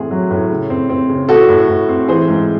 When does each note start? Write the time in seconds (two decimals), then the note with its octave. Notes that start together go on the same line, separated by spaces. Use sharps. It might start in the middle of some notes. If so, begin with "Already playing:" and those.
Already playing: A2 E3 C4 G#4
0.11 F#3
0.31 A2
0.50 C#3
0.70 C4
0.89 C4
1.09 C#3
1.29 A2 F#4 A4
1.49 A2
1.68 A2
1.89 C4
2.08 E3 G#4 C5
2.28 G#2